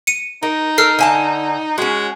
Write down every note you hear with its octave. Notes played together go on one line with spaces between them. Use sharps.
C#7 D#7
D#4 A#4
A4 A#4 E6 F6 C7
D3 G#5 A5
G#3 C#4 F#4